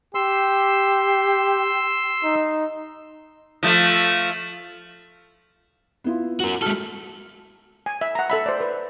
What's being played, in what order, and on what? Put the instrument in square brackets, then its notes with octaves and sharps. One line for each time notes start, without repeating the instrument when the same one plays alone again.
[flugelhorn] G4 [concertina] C6 E6
[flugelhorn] D#4
[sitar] F3 A3
[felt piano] B3 E4 F4
[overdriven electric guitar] F#4 A#4
[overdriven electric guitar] G#3 A4 [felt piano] F#4 F6
[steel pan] G#5
E5
F#5 A#5
A4 E5 B5
C5 D5
B4